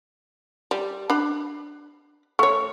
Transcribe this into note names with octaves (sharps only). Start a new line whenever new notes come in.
G3
D4 B5
A3 C#5 C#6